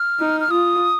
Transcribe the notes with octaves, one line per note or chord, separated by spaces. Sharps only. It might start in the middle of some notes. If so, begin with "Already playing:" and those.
Already playing: F6
D#4
F6
F4 D#6